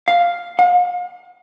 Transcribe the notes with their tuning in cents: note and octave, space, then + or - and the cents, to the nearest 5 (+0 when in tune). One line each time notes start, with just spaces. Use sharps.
F5 +0
F5 +40